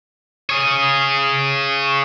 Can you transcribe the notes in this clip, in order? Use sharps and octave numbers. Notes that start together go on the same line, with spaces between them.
G#4 C#5